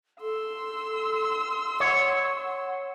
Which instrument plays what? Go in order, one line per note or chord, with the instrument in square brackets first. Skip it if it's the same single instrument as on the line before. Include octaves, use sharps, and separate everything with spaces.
[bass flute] A4 [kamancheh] C6 E6
[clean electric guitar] C#5 [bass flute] F#5